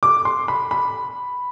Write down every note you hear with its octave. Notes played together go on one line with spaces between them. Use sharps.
D6
C6
B5
B5